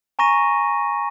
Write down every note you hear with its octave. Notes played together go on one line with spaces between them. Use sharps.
G#5 A#5 C#6 A#6 D#7